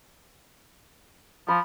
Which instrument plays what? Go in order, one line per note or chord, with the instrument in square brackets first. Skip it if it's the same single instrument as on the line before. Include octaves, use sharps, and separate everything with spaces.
[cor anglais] F3 [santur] B5